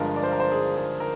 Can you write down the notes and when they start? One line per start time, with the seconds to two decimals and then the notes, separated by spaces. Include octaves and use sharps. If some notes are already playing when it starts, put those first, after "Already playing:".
Already playing: G1 G2 F3 G#3 A#4
0.16 D5
0.23 C5
0.32 A#4
0.40 C5
0.52 G#4
0.76 G#4
1.00 A#4